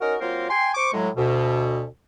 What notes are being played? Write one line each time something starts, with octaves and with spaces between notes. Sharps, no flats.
C#4 D#4 F#4 A#4
F#3 A#3 C4 F4 A#4 C5
G5 G#5 C6
C5 C#6 D6
A2 F#3 G#3
D2 B2